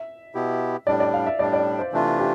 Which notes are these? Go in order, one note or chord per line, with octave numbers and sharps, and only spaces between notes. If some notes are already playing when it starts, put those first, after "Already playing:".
Already playing: E5
B2 B3 E4 G4
A2 G3 D4 D5
D5
F5
E5
A2 G3 D4 D5
D5
C5
C3 E3 A3 D4 F4
G4